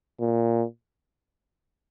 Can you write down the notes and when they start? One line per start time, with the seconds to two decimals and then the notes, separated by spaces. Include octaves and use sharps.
0.20 A#2